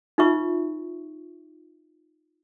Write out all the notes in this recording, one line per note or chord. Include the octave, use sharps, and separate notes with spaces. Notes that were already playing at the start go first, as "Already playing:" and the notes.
D#4 F4 B4 E5 C#6